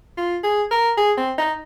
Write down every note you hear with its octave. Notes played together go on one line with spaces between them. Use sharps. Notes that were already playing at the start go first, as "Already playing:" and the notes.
F4
G#4
A#4
G#4
C4
D#4